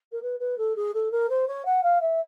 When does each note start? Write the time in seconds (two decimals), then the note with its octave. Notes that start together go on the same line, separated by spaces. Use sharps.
0.12 A#4
0.22 B4
0.39 B4
0.57 A4
0.75 G#4
0.94 A4
1.11 A#4
1.29 C5
1.47 C#5
1.65 F#5
1.83 F5
2.01 E5